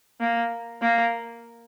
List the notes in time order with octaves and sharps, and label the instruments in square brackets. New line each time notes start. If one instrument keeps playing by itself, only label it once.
[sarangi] A#3
A#3